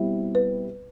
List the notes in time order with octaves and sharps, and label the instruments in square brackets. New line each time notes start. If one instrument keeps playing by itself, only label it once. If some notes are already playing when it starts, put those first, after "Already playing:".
Already playing: [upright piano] B2 G3 C4 E4
[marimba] B4